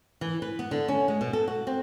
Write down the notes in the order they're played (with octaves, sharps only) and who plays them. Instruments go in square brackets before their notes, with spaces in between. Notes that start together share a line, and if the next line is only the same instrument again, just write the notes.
[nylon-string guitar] E3
B4
B3
D3
C#4
G#3
B2
A4
F#4
C4